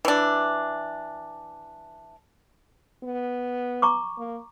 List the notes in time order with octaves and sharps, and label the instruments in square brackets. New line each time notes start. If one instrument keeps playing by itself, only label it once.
[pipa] E3 D4
[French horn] B3
[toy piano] A#5 C#6 D6
[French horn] A#3